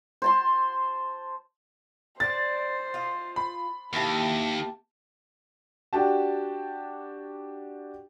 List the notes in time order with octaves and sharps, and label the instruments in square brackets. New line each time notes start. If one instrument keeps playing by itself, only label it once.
[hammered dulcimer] C5 A5 C6
[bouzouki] D4 [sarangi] C5 [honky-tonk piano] A6
[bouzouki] F4 D#5
[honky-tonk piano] B5
[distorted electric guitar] D#2 [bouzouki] A#3 E4 G4 [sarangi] A5
[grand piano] D4 F#4 G4 A5